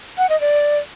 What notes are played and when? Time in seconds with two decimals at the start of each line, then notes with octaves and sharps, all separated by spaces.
0.18 F#5
0.29 D#5
0.41 D5